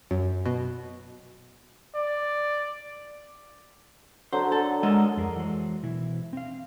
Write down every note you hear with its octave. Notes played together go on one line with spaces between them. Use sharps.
F#2
B2
D5
D3 F#3 C5
A4
G#3 A4 A#4 D#5
F2 G#4 A#4
E3 F#3 G#3 C5
B2 E3 E4
C4 F5